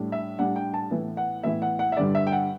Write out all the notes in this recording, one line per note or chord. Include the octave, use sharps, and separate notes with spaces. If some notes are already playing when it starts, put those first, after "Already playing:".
Already playing: A2 G3 D4
E5
A2 G3 D4 F#5
G5
A5
A2 E3 B3 E4
F#5
A2 E3 B3 E4 E5
F#5
F#5
E5
G2 D3 G3 D5
E5
G5
F#5